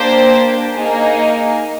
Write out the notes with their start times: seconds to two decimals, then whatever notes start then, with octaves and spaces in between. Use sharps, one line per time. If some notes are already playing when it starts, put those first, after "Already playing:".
Already playing: A#3 D4 G4 C5
0.74 A#3 D#4 G#4